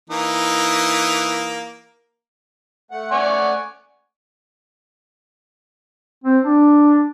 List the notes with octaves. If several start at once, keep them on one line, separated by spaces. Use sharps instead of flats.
E3 A#3 D#4
A3 F#5
D5 G#5 C#6
C4
D4